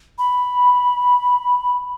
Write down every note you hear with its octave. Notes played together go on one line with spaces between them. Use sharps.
B5